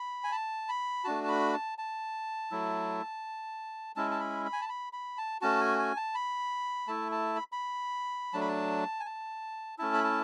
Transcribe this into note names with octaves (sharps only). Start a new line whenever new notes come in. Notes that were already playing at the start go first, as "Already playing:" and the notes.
Already playing: B5
G#5
A5
B5
A3 D4 F#4 A5
A5
B5
A5
A5
F#3 A3 E4
G#3 C#4 E4 A5
A5
B5
B5
G#5
A5
B5
B5
A5
A3 C#4 F#4 A5
G#5
G#5
A5
B5
A3 E4 A5
A5
B5
B5
F#3 A3 D4 A5
B5
A5
G#5
A5
A3 C#4 E4 A5
B5
A5